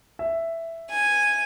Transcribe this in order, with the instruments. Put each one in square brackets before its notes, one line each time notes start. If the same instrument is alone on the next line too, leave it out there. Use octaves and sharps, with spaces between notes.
[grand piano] E5
[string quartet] G#5